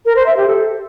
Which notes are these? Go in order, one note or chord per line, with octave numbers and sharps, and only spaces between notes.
A#4
C5
E5
G4
A4